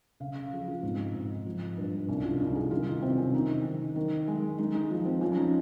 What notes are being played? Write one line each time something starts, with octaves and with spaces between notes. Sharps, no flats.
C#3 F5
F5
F3 G#4
F4
G#2 C4
G#2
F3
G2
C2 C#4
F4
C2 D#4
G#4
D#3 F4
D#4
C3 C4
C#4
D#3 D#4
D#3
D#3
G#3
G#3 D#4
D#4
F3
C4
F3 C#4
C#4
D#4